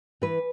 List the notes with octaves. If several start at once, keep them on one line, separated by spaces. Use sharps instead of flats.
E3 B4